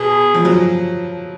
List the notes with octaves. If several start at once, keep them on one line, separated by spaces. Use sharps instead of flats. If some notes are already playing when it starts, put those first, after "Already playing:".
Already playing: B2 G#4
F3
F#3